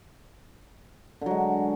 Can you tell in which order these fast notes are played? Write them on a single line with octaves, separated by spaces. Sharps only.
D3 F#3 G#3